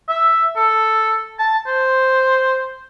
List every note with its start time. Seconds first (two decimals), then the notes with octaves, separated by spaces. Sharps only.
0.08 E5
0.57 A4
1.39 A5
1.67 C5